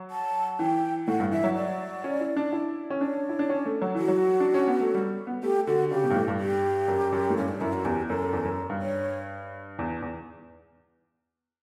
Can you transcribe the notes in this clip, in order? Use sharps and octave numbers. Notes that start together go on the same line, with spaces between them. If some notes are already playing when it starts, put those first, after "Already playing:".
Already playing: F#3
A5
E3 G5
A2 F#5
G2
E3 E5
F#3
D5
C#4
E4
D4
E4
C#4
D4 C#5
E4
D4
C#4
A3
F#3
E3 F#4
F#3
D4
C#4
B3
A3
G3
B3
A3 G4
D3 F#4
C#3 G4
B2
G2
A2
G2
G4
F#2
F#2
A2
G2 C#4
D4
F#2 E4
F#4
E2 G4
F#2 A4
E2
F#2
G2
C#5
E2
E2